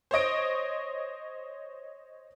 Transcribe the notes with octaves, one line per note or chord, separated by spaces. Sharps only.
C5 C#5 D#5 D7